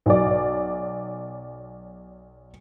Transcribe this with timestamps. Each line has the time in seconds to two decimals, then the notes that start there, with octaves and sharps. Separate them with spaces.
0.06 B1 D5